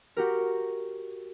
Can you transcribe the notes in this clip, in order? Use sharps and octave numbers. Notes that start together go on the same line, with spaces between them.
F#4 G4 A#4